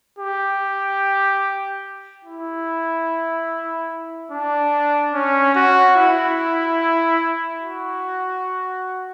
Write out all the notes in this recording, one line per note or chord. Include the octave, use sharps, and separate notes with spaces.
G4
E4
D4
C#4
F#4
E4
F#4